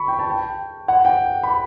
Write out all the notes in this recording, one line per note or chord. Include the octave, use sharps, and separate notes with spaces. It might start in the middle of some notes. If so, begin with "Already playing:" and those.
Already playing: B5 C#6
G5
A5
G5
F#5
G5
B5